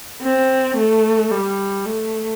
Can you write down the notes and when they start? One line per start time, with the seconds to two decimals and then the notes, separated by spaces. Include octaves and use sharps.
0.23 C4
0.77 A3
1.32 G3
1.86 A3